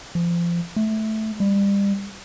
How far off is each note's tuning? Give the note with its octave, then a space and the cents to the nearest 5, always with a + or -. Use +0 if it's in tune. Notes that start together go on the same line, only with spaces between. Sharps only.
F3 -25
A3 -10
G3 +30